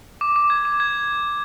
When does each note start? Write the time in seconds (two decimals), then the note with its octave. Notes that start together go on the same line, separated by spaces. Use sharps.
0.21 D6
0.36 D6
0.50 G#6
0.65 D6
0.80 G#6